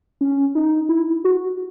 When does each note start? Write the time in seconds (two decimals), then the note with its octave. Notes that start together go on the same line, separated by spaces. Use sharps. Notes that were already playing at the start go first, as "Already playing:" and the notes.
0.21 C#4
0.55 D#4
0.89 E4
1.24 F#4